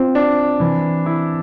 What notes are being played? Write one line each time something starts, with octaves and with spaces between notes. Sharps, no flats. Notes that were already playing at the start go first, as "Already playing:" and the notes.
Already playing: C4 F4
D4
E3
E4